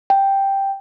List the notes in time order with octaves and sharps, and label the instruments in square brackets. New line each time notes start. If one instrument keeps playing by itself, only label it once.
[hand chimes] G5